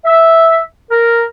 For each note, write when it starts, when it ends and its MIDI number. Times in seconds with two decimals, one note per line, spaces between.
0.05 0.59 76
0.91 1.24 70